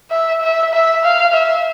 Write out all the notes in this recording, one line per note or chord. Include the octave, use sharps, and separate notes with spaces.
E5
E5
E5
F5
E5